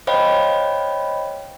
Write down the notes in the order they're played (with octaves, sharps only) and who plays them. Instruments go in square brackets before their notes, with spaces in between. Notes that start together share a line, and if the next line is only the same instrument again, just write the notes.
[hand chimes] C5 C#5 D#5 F5 G5 B5